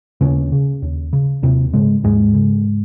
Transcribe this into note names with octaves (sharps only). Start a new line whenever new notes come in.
D#2 C#3 C#4
C#3
D#2
C#3
D#2 C3 C4
G#2 C#3 G#3
D#2 G#2 G#3
C#3